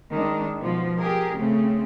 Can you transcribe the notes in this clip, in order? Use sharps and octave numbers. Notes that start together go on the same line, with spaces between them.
D#3 G#3 D4
B2 F3
G4 G#4 A#4
C#3 A3 C4